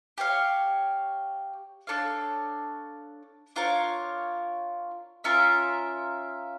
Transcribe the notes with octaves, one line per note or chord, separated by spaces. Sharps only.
G4 C#5 F5
D4 A4 C#5 F5
D4 F4 A#4 C#5
C#4 F4 A#4 E5